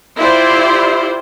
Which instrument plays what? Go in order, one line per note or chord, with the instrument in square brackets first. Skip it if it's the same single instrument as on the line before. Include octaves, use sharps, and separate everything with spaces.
[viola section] E4 F4 G4 C5 D5